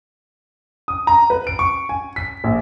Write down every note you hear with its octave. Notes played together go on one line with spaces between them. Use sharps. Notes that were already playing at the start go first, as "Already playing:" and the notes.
D#6
A#5
B4
D7
C#6
G#5
B6
A#1